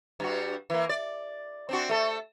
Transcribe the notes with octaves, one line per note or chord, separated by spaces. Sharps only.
G2 G3 F#4
E3 A#3
D5
C4 D4 F#4
A3 A4